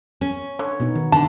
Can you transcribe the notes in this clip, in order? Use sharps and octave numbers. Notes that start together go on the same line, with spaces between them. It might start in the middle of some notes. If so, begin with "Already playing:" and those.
C#4
D3 C#5
B2 B3 D#4
D#3
D3 A5